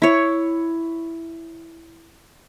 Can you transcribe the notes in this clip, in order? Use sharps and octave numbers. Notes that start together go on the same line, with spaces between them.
E4 C#5